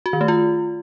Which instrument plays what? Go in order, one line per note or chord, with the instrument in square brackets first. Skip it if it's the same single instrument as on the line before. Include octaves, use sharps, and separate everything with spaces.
[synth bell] F#4
D#3
A3
F4